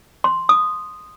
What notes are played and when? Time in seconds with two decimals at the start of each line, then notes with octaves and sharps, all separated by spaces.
0.24 C6
0.49 D#6